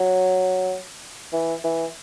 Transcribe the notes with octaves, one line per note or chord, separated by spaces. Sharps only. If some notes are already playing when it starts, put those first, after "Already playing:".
Already playing: F#3
E3
E3